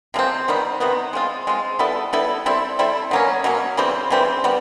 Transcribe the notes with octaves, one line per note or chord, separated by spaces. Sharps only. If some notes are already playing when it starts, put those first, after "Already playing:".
C3 F3 G#3 C4
C3 D#3 G3 B3
C3 D#3 G3 B3
G#3 C4 F4
G#3 C4 F4
G3 B3 E4 A4
G3 B3 E4 A4
G3 C4 E4 A4
G3 C4 E4 A4
B2 F#3 A#3 C#4
B2 F#3 A#3 C#4
C#3 E3 G3 C4
C#3 E3 G3 C4
G3 B3